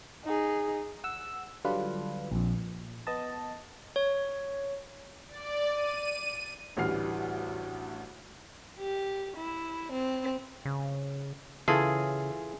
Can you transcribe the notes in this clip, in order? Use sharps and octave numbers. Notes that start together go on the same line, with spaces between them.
D#4 G#4
F#5 E6
D3 F#3 G3 D4 F4 B4
A#1 F2
A#2
B3 D#5 A5
C#5
D5
D#7
A1 D2 E3 G3 F6 C7
G4
E4
C4
C#3
C#3 E3 F4 G#4 A4